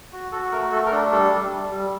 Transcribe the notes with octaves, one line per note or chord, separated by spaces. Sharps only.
F#4
F#4 A4
A3 A#4
A3 A4
A#4
D4 A4
G3 A4
G3
G3
G3